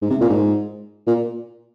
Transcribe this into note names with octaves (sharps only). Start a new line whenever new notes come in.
G#2
C3
A#2
G#2
A#2